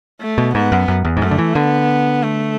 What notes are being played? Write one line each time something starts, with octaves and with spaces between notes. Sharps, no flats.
A3
B2
G#2 B3
F#2
F#2
E2
G#2
F#2 A3
D3
E3
D3 B3
A3